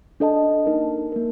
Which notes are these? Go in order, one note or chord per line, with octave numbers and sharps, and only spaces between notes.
D4 A4 D#5 A5
A#3 D#4 A#4
A#3 D#4 A#4